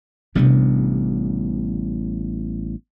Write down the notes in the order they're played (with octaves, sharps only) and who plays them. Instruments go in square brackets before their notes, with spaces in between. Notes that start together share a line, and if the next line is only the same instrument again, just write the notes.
[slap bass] A1 G3 B3 [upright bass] C3 D4